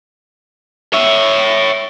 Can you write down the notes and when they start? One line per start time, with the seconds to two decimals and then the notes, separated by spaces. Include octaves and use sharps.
0.93 C#5 E5